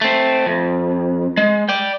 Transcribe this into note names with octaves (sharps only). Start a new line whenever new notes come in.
A3 C4
F2
G#3
D5 G5